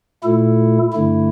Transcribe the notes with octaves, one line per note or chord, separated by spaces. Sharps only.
A#2 A3 E4 A4
G2 D3 A3 E4